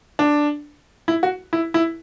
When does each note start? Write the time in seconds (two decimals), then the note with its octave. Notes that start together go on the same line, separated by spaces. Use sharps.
0.19 D4
1.08 E4
1.23 F#4
1.53 E4
1.74 E4